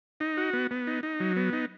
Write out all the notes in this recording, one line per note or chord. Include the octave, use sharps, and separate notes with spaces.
D#4
F#4
B3
B3
D#4
D#4
F#3
B3
D#4